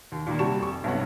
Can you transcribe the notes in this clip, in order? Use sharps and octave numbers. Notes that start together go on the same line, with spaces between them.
D#2
A#2 D#3 A#3
C3 G3 F#4 A5 C#6 E7
F1 C#6
B1 G2 C3 C#4 F#5